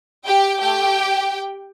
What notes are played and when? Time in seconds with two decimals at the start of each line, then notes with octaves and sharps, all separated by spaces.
0.25 G4 G5
0.60 A3 G4 G5